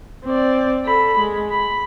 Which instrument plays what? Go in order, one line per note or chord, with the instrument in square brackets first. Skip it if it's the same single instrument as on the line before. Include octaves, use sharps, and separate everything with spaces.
[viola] C4 D5
A4 B5
G#3
B5